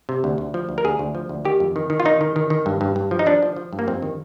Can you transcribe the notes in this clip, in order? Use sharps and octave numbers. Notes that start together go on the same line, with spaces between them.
C3
D2
D2
F3
D2
A#4
D2 G#4
D2
F3
D2
D#3 G4
F2
D#3
D#3
F4
D#3 D#4
D#3
D#3
D#3
G2
G2
G2
F3
D#4
F3 D4
F3
F3
G2
A#3
F2 C4
D#3